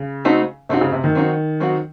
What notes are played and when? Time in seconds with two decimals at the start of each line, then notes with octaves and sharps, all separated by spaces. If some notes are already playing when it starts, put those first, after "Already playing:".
Already playing: C#3
0.25 A3 C4 D#4 F#4
0.69 C3 A3 C4 D#4 F#4
0.81 C#3
0.92 C3
1.04 D#3
1.15 F#3 C4 D#4 F#4
1.60 F#3 C4 D#4 F#4